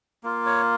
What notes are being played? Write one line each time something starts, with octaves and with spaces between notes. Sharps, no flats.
A#3 F4
C#5